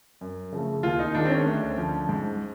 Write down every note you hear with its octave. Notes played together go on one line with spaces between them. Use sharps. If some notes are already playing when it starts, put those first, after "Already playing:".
F#2
C#3 F3 A3
D#2 F4
D#4
D#3 G#3 D4
C4
C#4
D2
D3 F3
G#2